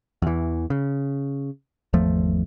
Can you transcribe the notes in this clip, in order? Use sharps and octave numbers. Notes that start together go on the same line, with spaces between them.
E2 E3
C#3
G#1 E2 F3 A3